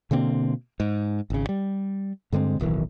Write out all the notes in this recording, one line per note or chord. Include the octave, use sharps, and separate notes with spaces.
B2 D3 A#3 C4
G#2
G#1 C#3
G3
G2 D3 G#3 C4
D1 B1 D#3 E3